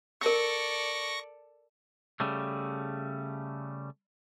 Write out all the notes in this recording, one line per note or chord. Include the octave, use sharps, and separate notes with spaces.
A4 A#4 D5 C#6 E6 A#6
C#3 G3 A3